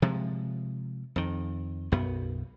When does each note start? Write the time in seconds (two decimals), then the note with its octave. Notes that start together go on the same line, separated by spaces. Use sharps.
0.02 C3 F3 G#3
1.16 F2 D#3
1.92 B1 F#2 B3